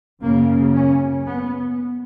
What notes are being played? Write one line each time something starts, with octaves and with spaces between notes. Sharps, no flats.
F#2 C#3 A#3
C#4
B3